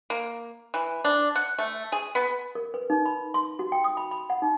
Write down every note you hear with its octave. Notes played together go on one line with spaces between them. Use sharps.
A#3
E3
D4
F#5
A3
G#4
B3
A#4
B4
D#4
B5
C6
F#4
G5
D#6
B5
B5
F#5
D#4